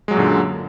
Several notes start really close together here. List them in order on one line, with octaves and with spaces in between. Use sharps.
G#3 F#3 F#2 A#2 D3